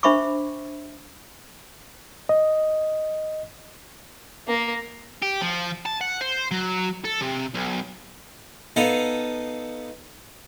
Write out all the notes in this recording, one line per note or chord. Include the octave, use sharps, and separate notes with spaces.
D4 C5 E5 B5 C#6 D6
D#5
A#3
G4
F3
A5
F#5
C5
F#3
A4
C3
B1
B3 D#4 A4 F5 A#5